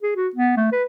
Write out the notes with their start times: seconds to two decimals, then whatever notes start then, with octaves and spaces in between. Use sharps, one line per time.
0.02 G#4
0.16 F#4
0.35 B3
0.57 A3
0.72 B4